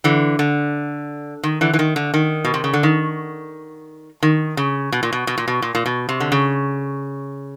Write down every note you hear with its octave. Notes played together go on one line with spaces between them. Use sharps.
D3 E3
D3
D#3
D3 E3
E3
D#3
D3
D#3
B2
C3
C#3
D3
D#3
D#3
C#3
B2
A#2
B2
B2
A#2
B2
A#2
A#2
B2
C3
D3
C#3